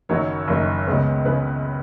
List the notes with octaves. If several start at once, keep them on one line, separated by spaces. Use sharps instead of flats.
F#1 F#2 D#3 F#3 C#5
F#1 F#2 D#3 F#3
C#2 C#3 G#3 B3
C#3 G#3 B4